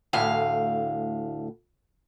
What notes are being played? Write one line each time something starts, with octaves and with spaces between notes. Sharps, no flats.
D2 A2 F5